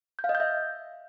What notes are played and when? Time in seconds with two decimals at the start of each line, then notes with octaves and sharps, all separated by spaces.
0.19 G6
0.24 F5
0.29 D#5
0.35 G6
0.40 E5